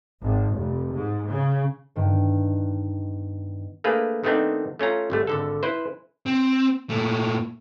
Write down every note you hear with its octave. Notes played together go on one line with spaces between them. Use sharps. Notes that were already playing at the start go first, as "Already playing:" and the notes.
G#1
F1
G#2
C#3
G2 D#3 B3
A3 A#3 D4 G#4 B4
D#3 A3 B3 C4 D4 D#4
A3 C#4 F4 A#5
G#1 G3 A3
G#1 D3 A4
E4 B4 C5
C4
A#2 A3